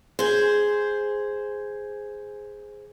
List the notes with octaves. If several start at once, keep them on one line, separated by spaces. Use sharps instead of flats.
G#4 C5